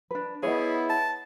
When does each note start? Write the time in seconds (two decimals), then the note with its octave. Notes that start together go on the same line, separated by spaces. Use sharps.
0.11 D4 B4
0.43 B3 E4 G#4 C#5 D#5
0.90 A5